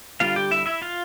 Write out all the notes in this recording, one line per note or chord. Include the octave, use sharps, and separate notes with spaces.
D3 G3 B3 F4 F5
G4 G5
E4 E5
E4 E5
F4 F5